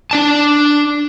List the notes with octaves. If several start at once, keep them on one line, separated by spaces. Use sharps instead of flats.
D4 D5 A5